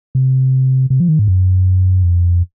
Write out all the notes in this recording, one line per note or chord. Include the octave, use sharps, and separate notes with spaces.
C3
C3
F3
D#3
G#2
F#2
F2